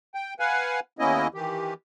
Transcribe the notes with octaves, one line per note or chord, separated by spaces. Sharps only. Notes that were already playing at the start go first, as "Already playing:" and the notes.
G5
B4 F5 F#5 G#5
D#2 A#3 B3 C#4 E4 D#5
D#3 E3 G4